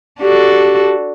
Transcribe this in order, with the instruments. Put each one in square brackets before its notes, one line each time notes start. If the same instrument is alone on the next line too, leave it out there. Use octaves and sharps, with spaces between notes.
[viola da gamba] D4 F#4 A4 [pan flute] G4